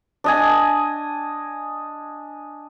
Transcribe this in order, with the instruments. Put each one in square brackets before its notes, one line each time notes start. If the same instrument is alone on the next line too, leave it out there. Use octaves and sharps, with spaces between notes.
[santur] D4 D#5 G#5